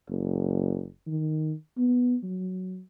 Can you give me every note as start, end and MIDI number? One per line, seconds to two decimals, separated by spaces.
0.10 0.86 30
1.07 1.53 51
1.78 2.16 59
2.23 2.81 54